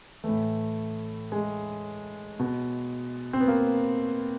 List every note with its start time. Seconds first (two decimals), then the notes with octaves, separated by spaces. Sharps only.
0.24 A2 E3 A3
1.32 G#3
2.40 B2
3.33 C4
3.40 B3
3.48 A#3